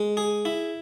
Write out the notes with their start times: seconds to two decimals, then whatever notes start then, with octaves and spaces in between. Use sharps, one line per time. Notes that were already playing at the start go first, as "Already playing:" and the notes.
Already playing: G#3
0.17 G#4
0.45 E4